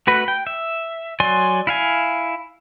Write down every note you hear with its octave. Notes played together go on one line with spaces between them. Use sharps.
A3 F#4 B4
G5
E5
F#3 D5 G#5 C6
E4 F5 G#5